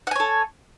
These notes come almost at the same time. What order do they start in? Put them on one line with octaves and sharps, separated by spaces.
F#5 G#5 C#5 A4